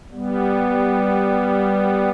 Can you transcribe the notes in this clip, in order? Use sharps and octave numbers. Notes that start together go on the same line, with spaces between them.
G3 B3